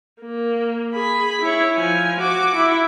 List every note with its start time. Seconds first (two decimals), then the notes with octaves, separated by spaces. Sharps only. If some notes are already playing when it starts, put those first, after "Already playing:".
0.21 A#3
0.93 G#4 B5
1.41 E4 C#5
1.76 F3 G#5
2.20 F#4 D6
2.55 E4